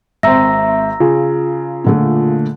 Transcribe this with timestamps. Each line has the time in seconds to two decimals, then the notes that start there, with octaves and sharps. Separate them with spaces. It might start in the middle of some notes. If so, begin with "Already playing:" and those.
0.23 G#1 C4 E5 A#5 E6 A#6
1.00 C#3 F4
1.84 A#2 D3 A3